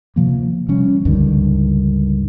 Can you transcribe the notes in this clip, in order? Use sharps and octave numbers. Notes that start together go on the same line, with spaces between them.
C3 F3 A#3
C3 F3 G3 C#4
C#2 G2 D3 D#3